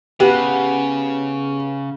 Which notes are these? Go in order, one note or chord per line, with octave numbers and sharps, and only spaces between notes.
C#3 B3 G4